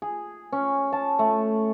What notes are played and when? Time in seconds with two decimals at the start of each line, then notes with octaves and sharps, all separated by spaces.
0.02 G#4
0.52 C#4
0.93 A5
1.19 A3